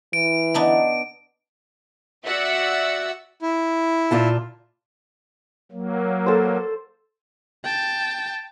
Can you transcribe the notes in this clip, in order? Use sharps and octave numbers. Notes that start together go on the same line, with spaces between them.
E3 D7
B3 D4 D#4
F#4 D5 E5 F#5 E6
E4
A#2 F4 A5
F#3 A#3
A4 C5
G5 A5